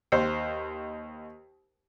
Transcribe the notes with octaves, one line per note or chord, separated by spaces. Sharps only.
D#2 C5